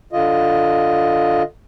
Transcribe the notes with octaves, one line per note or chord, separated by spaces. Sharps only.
D3 F4 D#5